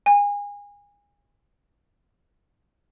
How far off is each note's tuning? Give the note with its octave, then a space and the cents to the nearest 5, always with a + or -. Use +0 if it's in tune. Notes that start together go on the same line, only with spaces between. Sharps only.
G#5 -30